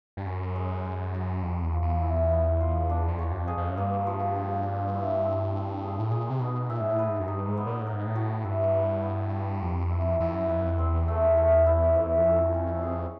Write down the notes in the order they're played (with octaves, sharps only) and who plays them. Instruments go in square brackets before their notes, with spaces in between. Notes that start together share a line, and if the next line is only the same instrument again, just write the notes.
[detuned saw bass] G2
[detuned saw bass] F#2 [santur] C#4
[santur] G#3
G#3
F#4
[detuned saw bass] F2 [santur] G#3
[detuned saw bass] E2
[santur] F3
[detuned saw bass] E2
[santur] E4
B3
F4
D4
[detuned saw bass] F2
[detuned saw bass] E2 [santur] C#5
[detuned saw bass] F#2
F2
[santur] G#4
[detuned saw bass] F2
F#2
[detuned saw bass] G2 [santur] A#3
[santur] F3
F3
D4
E4
C4
C4
G#4
[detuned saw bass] A2
[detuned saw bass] A#2 [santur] G#4
[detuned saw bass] C3
[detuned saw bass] B2 [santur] D#4
[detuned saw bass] A#2 [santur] E5
[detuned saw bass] G#2
A2
[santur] B4
[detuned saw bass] G#2
F#2
[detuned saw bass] G2 [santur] D#4
[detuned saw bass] G#2
[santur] B3
[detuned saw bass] A#2
A2
[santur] A#4
[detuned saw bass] G#2
A2
[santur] F#4
[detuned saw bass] G2 [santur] E4
[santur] B3
B3
G4
[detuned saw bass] F2 [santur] G4
[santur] E4
[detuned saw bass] F2 [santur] E4
[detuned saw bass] F#2
[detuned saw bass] F2 [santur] B4
[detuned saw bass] F#2
F2
[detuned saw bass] E2 [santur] C4
[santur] A3
A3
E4
[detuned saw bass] F2 [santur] E4
[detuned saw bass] E2
F2
[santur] C#4
C#4
G#4